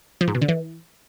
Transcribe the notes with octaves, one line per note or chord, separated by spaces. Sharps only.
F3
G#2
B2
D3
E3